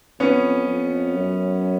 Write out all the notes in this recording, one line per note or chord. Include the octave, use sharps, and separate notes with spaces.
F2 B3 C#4
F2
F#2